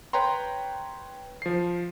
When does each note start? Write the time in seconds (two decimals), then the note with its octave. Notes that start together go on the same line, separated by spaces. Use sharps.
0.13 B4 C#5 G5 A#5 C6
1.42 F3 C7